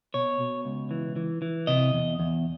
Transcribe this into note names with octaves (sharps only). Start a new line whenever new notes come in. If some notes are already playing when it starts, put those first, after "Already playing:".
B2 C#5
B2
C#2
E3
E3
E3
C3 D#5
E2
E2